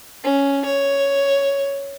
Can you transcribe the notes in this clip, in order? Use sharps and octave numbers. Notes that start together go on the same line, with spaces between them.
C#4
C#5